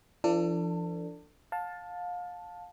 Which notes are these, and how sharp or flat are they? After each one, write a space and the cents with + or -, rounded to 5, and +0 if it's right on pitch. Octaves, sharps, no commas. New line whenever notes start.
F3 -45 D4 +0 A4 +30
F5 +30 A5 +0